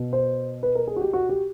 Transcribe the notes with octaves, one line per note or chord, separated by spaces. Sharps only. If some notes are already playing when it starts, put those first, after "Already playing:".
Already playing: B2
C5
B4
A#4
G#4
F#4
G4
F#4
G4